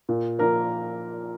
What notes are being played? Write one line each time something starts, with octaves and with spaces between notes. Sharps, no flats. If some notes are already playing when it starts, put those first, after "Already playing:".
A#2
F3 A#3 A#4